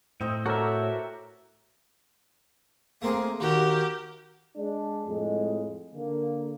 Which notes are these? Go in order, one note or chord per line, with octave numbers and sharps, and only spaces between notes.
A2 C4 D#5 E5
F#4 A4 A#4 C#5 D5 E5
A3 A#3 C4 G#4
D#2 F#4 G4 A#4
G#3 D4
F2 A2 G#3
D3 A#3